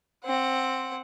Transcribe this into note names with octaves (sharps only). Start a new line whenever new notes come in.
C4 F#5